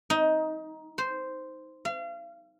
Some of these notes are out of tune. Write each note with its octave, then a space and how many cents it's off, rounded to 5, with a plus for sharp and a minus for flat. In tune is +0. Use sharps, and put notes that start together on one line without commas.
D#4 +15
C5 -5
F5 -35